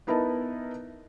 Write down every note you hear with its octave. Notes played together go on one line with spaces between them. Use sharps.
B3 D#4 E4 A#4 B4 A5